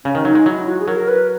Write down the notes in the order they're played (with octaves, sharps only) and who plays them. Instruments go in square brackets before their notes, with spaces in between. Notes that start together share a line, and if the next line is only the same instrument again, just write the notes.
[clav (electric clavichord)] C#3 [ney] C#4
[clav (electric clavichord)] D#3
[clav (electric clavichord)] F#3 [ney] D#4
[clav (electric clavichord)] G#3
[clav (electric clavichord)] F#3 [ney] E4
[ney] F#4
G#4
[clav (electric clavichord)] F#3 [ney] A#4
[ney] B4